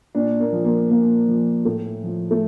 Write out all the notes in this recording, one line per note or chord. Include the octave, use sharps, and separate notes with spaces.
A#2 D4
A#3
F3
A#3
A#2 A#3
F3
A2 A3
F3
A3